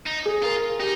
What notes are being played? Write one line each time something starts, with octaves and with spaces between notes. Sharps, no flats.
D#4
G#4
F4 A#4
D#4 G4